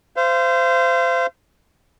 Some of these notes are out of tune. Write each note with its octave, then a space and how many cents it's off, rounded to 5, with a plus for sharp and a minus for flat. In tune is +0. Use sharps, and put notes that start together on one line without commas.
C5 -20 F5 -40